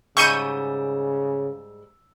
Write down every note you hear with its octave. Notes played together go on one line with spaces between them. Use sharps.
G#2 C#3 G3 C#6 E6 G6 D#7